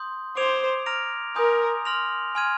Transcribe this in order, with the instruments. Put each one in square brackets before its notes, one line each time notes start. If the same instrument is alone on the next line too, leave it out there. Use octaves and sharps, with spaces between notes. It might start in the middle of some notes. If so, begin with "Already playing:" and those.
Already playing: [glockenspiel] C6 D#6 G6
[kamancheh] C5 [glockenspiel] D6 G#6 D7 F7
[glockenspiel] A#5 F6 A#6 D7 F7
[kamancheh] A#4 [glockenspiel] G#5 C6 D#6 G6
[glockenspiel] C6 F6 A#6 F7
G#5 C6 F6 G#6 D#7